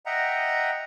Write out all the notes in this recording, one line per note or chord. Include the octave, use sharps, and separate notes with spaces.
D#5 E5 F#5 G5 A#5